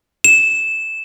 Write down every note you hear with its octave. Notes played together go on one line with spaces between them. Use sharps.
E7